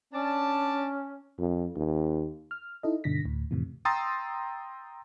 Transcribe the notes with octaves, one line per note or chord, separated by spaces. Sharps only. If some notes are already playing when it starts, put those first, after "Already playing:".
C#4 D4 D5 A5
F2
D#2
F6
D#4 E4 A4 D#5
G2 B2 D3 A#6 B6
D2 A2
F2 A2 C3 E3
G5 A#5 C6 D#6 E6 A6